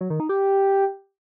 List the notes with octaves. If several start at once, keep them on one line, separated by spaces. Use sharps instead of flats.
F#3
D#3
D#4
G4